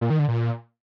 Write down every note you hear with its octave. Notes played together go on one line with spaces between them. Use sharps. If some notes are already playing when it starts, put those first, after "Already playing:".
A#2
D#3
D3
A#2